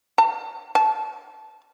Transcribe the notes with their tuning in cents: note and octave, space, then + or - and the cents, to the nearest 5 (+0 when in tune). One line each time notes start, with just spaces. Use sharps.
A5 +35
A5 -15